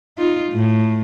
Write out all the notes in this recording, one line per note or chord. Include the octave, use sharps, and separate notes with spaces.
D#4 F4
A2